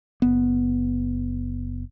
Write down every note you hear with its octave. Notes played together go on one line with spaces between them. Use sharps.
F#1 B3